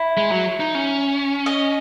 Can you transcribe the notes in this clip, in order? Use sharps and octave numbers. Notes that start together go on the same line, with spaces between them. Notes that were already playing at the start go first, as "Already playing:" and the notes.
Already playing: E4
G#3
F#3
D#4
C#4
D#5